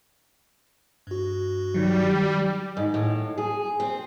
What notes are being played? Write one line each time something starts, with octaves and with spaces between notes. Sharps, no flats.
G2 F#4
D#3 F#3 G3
G#2
A2
G#4
C4